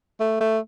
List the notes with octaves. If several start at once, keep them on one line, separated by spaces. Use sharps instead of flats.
A3
A3